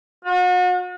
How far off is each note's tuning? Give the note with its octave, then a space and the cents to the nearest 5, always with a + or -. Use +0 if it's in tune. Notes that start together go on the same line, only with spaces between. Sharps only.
F#4 -40